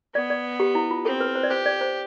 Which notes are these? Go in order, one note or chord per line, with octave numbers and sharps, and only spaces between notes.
B3 D5
D5
G4
E4
F4
C4 A4
B4
C5
D5
G4 C5
D5
C5